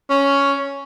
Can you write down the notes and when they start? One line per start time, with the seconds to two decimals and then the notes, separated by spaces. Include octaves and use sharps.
0.10 C#4